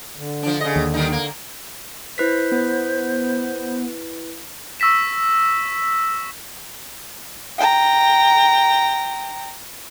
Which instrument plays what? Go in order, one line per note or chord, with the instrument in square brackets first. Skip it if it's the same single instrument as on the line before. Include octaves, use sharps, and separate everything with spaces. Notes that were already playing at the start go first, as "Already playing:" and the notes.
[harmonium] D3
[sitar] F3 D4
C#3 D#5
[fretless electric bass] D#2
[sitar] D#3 G3 D#4
A#3
[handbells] E4 B4 B6 [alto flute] C5
[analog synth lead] B3
[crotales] C#6 E6 A#6 B6 E7
[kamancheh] G5 A#5